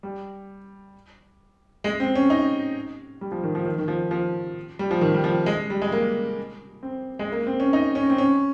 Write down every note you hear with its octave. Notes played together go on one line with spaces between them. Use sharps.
G3
G#3
C4
C#4
D#4
G3
F3
D#3
F3
D#3
D#3
F3
F3
G3
F3
D#3
G3
F3
G#3
G3
G#3
A#3
C4
G#3
A#3
C4
C#4
D#4
C#4
C4
C#4